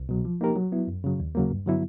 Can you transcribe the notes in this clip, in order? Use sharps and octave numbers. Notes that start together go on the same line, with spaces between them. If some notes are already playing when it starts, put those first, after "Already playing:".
Already playing: C2
B2 F#3
F3
A#3 D#4 G4 A#4
F#3
B3 E4
F#2
C#3 F#3
D#2
C#3 F#3 A#3
G2
D3 F#3 B3 E4